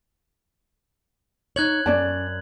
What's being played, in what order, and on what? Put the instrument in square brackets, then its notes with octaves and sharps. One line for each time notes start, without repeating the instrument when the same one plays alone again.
[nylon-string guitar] D#4 C#5 [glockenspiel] F#6 G#6 F#7
[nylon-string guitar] F#2 [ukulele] C#4 D5 A5